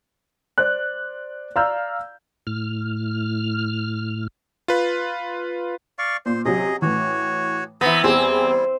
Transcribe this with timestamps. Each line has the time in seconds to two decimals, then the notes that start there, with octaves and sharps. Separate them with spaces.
0.58 C5 D5 F#6
1.56 D5 F5 A#5 E6 F6 G6
2.47 A2 F6
4.68 F4 B4
5.99 D5 F5 C#6
6.26 A#2 C5
6.45 C3 F#3 G#4 D#5
6.82 A2 E3 F#4 C#5
7.81 E3 B3 C4 C5 A#5 A#6
8.04 E2 G3 C4 E4 G4 G#4